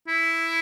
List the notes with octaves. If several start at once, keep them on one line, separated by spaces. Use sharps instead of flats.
E4